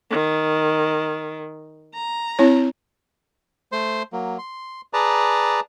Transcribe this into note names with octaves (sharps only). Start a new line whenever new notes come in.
D#3
A#5
C4 E4 C#5
A3 C5 C6
F#3 A#3
C6
G#4 B4 D5 A5 A#5